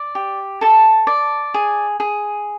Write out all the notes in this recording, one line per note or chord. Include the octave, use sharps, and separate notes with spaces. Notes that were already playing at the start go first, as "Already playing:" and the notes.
Already playing: D5
G4
A4 A5
D5
G#4
G#4